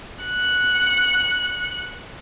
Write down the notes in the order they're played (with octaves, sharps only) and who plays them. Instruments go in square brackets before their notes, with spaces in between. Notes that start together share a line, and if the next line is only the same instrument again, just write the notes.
[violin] F#6 C#7